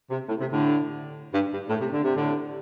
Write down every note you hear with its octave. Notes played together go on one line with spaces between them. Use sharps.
C3
A2
C3
A2 D3
G2
G2
A2
C3
D3
C3
A2 D3